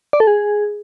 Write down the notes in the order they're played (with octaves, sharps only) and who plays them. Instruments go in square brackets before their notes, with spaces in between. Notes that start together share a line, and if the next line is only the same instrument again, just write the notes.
[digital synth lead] D5
A4
G#4